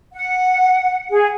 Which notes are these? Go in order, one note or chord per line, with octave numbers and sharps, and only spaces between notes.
F#5
G#4